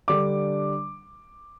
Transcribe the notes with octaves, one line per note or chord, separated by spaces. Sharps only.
D3 G3 D4 D6